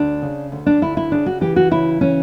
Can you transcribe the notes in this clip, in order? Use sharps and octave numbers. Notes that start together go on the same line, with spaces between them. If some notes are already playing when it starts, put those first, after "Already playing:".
Already playing: D2 D4
C#3
D2
D4
D2 E4
E4
C#3 D4
F#4
E3 G4
F#4
C#3 E4
E3 C#4